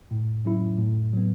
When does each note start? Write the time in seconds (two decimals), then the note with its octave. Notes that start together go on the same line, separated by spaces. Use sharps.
0.11 A2
0.45 F#3 C#4 E4
0.78 A2
1.13 F#3 B3